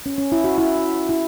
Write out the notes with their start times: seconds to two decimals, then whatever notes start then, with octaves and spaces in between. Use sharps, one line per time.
0.06 C#4
0.18 C#4
0.32 E4
0.44 F#4
0.58 E4
1.09 E4